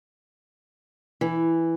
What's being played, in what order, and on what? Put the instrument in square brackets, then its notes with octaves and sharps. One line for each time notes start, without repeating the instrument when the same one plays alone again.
[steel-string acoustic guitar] E3